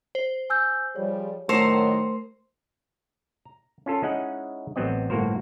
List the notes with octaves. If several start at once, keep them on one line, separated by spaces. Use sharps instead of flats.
C5
G#5 E6 G6
F3 G3 G#4 C#5
A2 D#3 F#3 A3 A#4 C5 C#7
A#5
C#4 F4 A4
G#3 C#4 D#4 E4 D#5 F#5
A1 F#3 B3 C4 D#5
G1 A2 A#3 F#4 A#4 C5